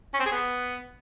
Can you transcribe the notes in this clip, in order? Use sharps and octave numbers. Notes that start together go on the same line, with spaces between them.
C#4
C4
G#4
B3